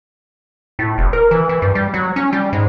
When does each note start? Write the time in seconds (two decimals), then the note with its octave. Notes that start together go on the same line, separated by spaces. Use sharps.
0.79 A2
0.98 E1
1.13 A#4
1.31 E3
1.49 E3
1.62 G2
1.75 G3
1.94 F#3
2.16 C#4
2.33 G3
2.53 G#2